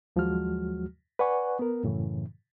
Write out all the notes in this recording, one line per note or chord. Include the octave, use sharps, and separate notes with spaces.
D#2 F3 F#3 G#3 F#4 F6
B4 D5 F#5 G#5 C#6
B3 A#4
F#2 A2 C#3 E3